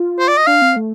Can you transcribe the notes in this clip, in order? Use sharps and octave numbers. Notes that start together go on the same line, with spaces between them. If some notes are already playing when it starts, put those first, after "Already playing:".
Already playing: F4
C5
D5
D#5
D4 F5
C4
A3